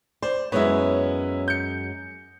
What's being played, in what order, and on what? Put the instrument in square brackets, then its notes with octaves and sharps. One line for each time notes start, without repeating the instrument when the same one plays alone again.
[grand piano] C5 [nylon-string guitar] D5
[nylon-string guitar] F#2 G#3 C#5 [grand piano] B3 C#4 E4
[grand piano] G6 C#7